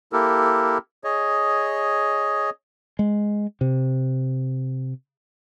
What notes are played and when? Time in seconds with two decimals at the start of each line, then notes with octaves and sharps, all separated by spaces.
0.13 A#3 E4 G4 A4 A#4
1.04 G#4 C#5 D#5
2.99 G#3
3.61 C3